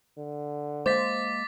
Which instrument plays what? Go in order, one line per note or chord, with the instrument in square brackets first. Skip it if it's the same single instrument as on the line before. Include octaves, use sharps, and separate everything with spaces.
[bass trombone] D3
[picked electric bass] G#3 A#3 [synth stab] C5 [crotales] D6 A6 B6